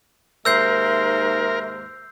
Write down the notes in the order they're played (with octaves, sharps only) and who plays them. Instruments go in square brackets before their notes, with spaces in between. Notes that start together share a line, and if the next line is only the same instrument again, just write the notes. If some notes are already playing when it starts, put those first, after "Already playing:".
[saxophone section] D#2 G#2 C5 [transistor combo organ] A#4 [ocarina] E5 [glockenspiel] E6 G6 C7